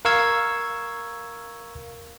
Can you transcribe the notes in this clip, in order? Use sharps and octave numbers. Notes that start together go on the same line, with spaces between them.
A#4 F5 C#6 E6 G#6